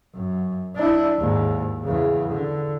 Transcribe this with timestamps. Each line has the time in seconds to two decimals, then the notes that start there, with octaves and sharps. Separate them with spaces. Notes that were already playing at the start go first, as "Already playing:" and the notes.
0.15 F#2
0.76 D4 E4
1.20 D#2 G#2
1.84 E2 C#3
2.31 D3